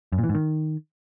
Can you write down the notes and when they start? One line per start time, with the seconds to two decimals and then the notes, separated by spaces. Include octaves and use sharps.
0.12 F#2
0.18 A#2
0.24 E3
0.29 G#2
0.35 D#3